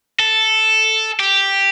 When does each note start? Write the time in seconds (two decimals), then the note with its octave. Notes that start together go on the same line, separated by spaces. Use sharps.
0.20 A4
1.19 G4